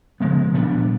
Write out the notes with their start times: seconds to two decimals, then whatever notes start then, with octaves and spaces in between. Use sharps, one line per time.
0.20 C#3 F3 G#3 B3
0.54 A#2 G3 B3 D4